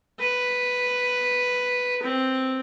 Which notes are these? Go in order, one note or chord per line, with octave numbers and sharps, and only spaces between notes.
B4
C4